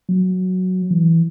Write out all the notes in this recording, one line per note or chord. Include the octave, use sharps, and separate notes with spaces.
F#3
E3